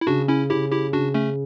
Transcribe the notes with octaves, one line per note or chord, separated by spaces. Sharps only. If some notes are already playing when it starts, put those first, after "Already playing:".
E4
C#3 D4 F#4
C#4 E4
C#3 E4 G4
E4 G4
C#3 D4 F#4
A3 C#4